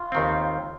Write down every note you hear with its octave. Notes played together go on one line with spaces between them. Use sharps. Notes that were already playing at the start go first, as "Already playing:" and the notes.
Already playing: F4
D#2 D#3 C4